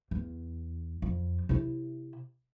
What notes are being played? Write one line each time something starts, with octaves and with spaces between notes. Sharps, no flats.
E2
F2
C3 E4